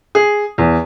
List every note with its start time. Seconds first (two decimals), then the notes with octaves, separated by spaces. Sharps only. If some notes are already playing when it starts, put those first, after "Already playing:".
0.15 G#4
0.58 E2